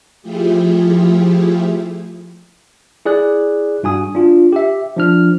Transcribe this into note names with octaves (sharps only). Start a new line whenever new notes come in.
F3 A3 E4 F4 G4 G#4
E4 G#4 D5 F#6
G2 F#4 G#5 D#6
D4 F4
G4 E5
F3 D4 F6